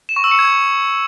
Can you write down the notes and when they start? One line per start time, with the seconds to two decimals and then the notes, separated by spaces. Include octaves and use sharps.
0.09 E7
0.16 C#6
0.24 E6
0.31 C#7
0.39 G#6